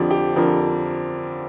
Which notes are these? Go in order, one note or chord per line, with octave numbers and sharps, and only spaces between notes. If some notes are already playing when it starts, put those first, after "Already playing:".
Already playing: F2 D3 F3 G4
G4
F2 D3 F3 A#4